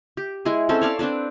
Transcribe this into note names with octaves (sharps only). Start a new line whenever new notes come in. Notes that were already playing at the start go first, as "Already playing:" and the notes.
G4
G#3 E4 G#4
C4 C#4 A4
C#5 D5 F5 A5
C4 D4 B4 D5